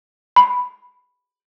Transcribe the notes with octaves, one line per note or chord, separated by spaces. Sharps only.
B5